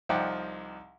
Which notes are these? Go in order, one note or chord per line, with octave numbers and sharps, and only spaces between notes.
C2 F3 D#4 D5 F#5 G5